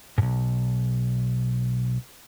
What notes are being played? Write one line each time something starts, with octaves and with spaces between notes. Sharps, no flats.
B1 G#2